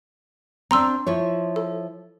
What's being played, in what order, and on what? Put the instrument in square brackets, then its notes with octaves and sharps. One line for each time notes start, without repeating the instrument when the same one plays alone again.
[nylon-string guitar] C4 D4 [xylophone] A#5 C6 E6
[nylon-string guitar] F3 E4 C#5
[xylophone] A4